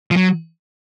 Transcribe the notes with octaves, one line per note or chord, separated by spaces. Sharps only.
F3
F#3